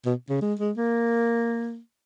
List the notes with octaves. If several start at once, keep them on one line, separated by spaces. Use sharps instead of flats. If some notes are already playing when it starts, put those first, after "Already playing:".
B2
C#3
G#3
G#3
A#3